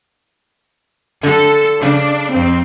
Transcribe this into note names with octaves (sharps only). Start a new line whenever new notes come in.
D3 A4
C#3 D4
F2 C4